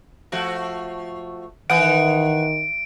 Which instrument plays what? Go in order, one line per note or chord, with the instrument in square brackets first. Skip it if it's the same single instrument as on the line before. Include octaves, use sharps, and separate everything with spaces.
[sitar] F3 A3 F#4
[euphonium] D#3 [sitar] E3 [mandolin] F#5 D#6 [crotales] D7